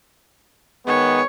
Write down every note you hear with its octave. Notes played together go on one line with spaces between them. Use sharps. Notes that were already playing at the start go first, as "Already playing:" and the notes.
D#3 G#3 B3 C#5